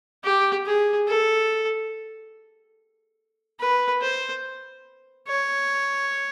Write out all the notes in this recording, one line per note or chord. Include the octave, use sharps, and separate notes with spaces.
G4
G#4
A4
B4
C5
C#5